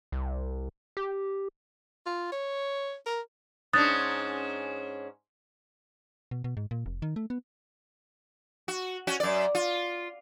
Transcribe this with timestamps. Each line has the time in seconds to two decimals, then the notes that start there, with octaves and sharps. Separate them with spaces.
0.12 C2
0.97 G4
2.06 F4
2.32 C#5
3.06 A#4
3.73 G#2 C#4 D4 D#6 F#6 A6
6.31 B2
6.44 B2
6.57 G#2
6.71 A#2
6.86 F1
7.02 D#3
7.16 A3
7.30 B3
8.68 F#4
9.07 C#4 F#4
9.20 F#2 D5
9.55 F4